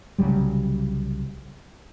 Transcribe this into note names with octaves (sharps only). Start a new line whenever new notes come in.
C2 C#3 F#3 G3